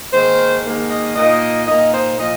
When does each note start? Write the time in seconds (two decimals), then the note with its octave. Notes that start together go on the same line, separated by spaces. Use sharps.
0.13 G#2 D#3 A#3 C5
0.65 G#2 D#3 A#3
0.90 D#5
1.15 A#2 A#3 D#4 D#5
1.67 A#2 A#3 D#4 D#5
1.94 C5
2.18 A#2 F3 D#5